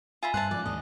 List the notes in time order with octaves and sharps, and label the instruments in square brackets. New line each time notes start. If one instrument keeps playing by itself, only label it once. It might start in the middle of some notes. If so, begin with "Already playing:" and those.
[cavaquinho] F4 E5 B5 [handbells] G#5
[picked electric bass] G2 [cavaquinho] C5 E5 A5 [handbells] F#6
[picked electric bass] G#2 F3 [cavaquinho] D5
[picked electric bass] D#2 G#2 G#3 [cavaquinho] D#5